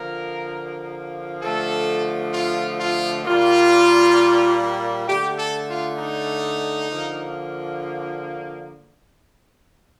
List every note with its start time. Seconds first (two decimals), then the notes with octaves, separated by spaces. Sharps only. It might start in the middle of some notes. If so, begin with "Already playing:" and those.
Already playing: D3 F3 A#3 A#4
1.42 D3 F3 A3 A4
2.34 F4
2.79 F4
3.25 A#2 G3 A#3 F4
5.07 D3 A3 G4
5.38 A4
5.69 F4
5.98 D#4
6.90 D3 F3 A#3